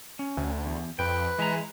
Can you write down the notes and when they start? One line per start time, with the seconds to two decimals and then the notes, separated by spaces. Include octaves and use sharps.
0.19 C#4
0.37 D2
0.66 E2
0.99 F2 B4 G5
1.38 E3 G#3 E5 A#5